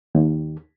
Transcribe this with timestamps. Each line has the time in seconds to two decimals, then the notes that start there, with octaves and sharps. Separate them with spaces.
0.15 D#2